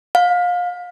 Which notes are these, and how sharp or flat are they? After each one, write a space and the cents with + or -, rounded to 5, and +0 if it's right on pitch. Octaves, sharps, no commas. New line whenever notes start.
F5 +30